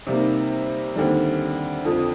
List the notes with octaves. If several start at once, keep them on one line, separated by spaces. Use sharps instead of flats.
C3 G3 A#3 D#4
D#2 D3 G3 C4
F2 D3 F3